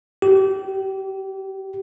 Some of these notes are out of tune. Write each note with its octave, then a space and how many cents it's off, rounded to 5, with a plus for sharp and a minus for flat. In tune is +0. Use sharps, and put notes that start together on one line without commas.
G4 -30